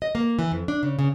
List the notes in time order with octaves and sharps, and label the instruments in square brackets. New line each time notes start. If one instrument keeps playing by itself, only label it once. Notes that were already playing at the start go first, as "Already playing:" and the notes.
[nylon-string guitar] D#5
A#3
E3
F2
D4
C#3
C#3